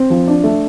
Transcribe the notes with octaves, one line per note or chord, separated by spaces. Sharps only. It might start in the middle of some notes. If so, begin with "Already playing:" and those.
Already playing: C4
F3
D4
A3